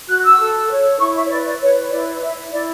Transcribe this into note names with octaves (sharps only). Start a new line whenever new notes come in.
F#4 F#6
E6
A4
C#5
E4 C#6
E5
C#5
B4 D5
D5
B4 C#5
E4 D5
D5
E4 E5
E4 D5